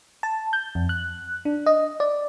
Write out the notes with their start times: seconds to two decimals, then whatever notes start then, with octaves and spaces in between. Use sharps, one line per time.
0.23 A5
0.53 G6
0.75 F2
0.89 F#6
1.45 D4
1.66 D#5
2.00 D5